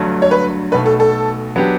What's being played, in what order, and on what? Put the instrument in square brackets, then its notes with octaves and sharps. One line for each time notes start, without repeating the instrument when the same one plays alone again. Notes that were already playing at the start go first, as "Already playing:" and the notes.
Already playing: [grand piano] G1 G2 F#3 A3
[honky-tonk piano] C#5
B4
[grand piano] B1 B2 A3 [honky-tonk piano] B4
[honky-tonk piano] A4
A4
[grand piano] F#3 B3 D4 G4